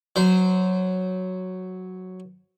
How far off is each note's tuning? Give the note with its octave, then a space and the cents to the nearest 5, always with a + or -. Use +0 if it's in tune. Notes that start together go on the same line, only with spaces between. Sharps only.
F#3 +0 C5 -20